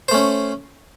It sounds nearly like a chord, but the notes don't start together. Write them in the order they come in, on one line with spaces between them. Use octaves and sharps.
C5 A3 C#4